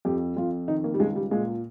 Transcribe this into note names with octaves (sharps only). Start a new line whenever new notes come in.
F2 G4
F2 F4
D#3 D#4
A#3
G3
C#2 G#3
G3
A#2 G#3